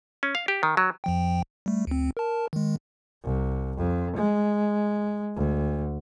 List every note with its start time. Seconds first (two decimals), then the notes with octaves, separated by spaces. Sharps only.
0.23 C#4
0.35 F5
0.48 G4
0.63 D#3
0.77 F#3
1.04 F2 F3 G5
1.66 G3 A3
1.87 D2 C4
2.17 A#4 A5
2.53 D#3 G#3
3.23 C2
3.77 F2
4.16 G#3
5.36 D2